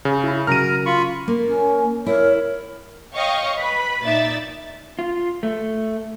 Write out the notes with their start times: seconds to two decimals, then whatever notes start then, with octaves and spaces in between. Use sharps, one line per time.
0.05 C#3
0.24 E4 B5
0.47 C#3 F#3 A#4 A#5 F6 D#7
0.86 F4 B5 C#6
1.28 A#3
1.47 C#4
2.06 E4 A#4 C#5
3.14 C#5 D#5 F5 G5 C#6
3.57 B4 B5
4.04 A#2 D#4 D5 E5 A6
4.99 F4
5.43 A3